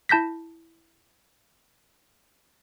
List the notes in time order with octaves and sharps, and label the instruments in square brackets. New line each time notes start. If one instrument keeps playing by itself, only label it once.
[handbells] E4 A5 G6 A#6 B6